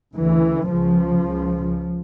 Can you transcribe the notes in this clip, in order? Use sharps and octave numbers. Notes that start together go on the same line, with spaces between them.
D2 C#3 E3
C#2 C#3 F3
C#2 C#3